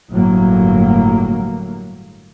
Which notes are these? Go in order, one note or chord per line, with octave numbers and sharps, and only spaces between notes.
G1 A2 F#3 A#3